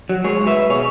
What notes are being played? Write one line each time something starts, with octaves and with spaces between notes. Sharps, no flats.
F#3
G#3 G#4 C#5
G#2
B4 E5
G#2
B2 G#4 C#5